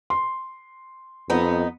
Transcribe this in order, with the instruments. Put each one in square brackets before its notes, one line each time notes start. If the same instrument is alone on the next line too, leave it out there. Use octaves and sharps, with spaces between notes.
[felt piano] C6
[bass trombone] F2 [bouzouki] B3 D#4